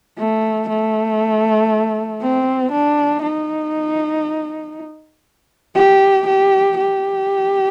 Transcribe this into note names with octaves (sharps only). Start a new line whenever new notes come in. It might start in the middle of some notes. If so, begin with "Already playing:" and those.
A3
A3
C4
D4
D#4
G4
G4
G4